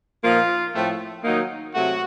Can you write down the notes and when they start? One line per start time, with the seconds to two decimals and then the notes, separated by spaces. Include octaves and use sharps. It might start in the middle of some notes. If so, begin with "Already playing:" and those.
0.22 A#2 F3 A#3 D#4 F4
0.73 A2 F3 A3 C4
1.23 D#3 F#3 A#3 D#4
1.73 C3 F#3 A3 F#4